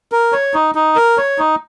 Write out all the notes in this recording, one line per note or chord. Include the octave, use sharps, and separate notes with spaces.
A#4
C#5
D#4
D#4
A#4
C#5
D#4